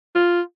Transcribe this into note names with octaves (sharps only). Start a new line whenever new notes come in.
F4